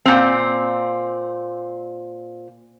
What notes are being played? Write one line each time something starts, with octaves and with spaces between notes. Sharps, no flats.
A#2 C4